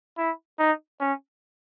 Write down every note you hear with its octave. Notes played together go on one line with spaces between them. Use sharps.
E4
D#4
C#4